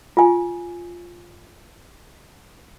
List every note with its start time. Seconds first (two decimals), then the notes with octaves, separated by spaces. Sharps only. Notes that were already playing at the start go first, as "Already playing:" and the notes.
0.17 F4 G#5